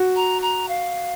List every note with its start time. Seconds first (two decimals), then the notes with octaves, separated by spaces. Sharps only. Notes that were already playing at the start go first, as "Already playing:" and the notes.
Already playing: F#4
0.16 A#5
0.42 A#5
0.68 F5